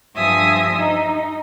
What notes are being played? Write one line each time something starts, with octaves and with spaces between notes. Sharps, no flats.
G2 F3 E5 G#5 D#6
D#4